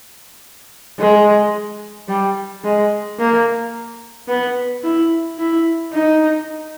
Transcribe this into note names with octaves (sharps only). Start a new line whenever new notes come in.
G#3
G3
G#3
A#3
B3
E4
E4
D#4